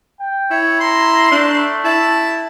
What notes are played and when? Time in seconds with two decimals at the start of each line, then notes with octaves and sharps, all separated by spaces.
0.20 G5
0.51 E4 C#5
0.80 A#5 C6
1.31 A3 D4
1.85 E4 A5